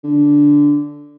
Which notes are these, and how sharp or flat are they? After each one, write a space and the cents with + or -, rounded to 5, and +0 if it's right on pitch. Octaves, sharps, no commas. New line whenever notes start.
D3 -10